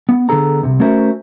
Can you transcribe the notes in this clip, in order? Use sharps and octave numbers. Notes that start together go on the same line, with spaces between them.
B3
D3 B3 D4 G#4 A4 A#5
C2 G#2 C3
A3 C#4 F#4 A#4 C5 E5